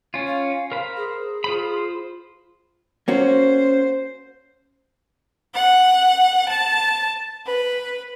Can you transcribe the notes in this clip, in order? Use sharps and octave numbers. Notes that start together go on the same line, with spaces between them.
C#4 F4
F5
A#4 C5 B5
G#4
F4 C5 B5
A#3 C#4 F#4 C5
F#5
A5
B4